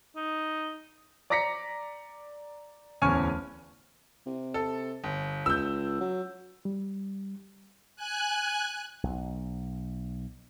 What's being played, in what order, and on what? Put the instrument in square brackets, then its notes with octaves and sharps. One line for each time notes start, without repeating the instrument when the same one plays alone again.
[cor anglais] D#4
[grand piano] D5 A#5 D6 A#6 B6 C#7
D1 E2 C#4 G#5 C#6 F6
[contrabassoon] C3
[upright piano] A4
G1
[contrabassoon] C#2 [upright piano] E6 G6
[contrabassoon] F#3
[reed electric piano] G3
[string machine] G#5 F#6
[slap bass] B1